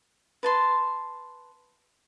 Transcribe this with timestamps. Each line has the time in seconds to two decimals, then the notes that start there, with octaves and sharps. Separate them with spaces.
0.43 B4 A5 C6